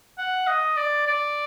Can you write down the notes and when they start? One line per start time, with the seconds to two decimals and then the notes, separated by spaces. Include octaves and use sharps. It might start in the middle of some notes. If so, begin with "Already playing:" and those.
0.18 F#5
0.47 D#5
0.77 D5
1.07 D5